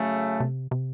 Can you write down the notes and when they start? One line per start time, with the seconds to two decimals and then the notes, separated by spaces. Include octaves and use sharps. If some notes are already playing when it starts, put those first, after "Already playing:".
Already playing: C#3 F#3 A3
0.40 C3
0.71 C3